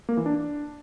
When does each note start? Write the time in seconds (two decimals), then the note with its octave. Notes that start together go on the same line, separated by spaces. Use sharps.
0.09 A#3
0.17 E3
0.26 D4